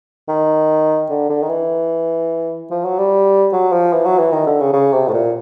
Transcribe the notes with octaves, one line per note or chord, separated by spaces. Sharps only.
D#3
D3
D3
D#3
E3
F3
F#3
G3
F#3
F3
E3
F#3
E3
D#3
D3
C#3
C#3
C3
A2
A#2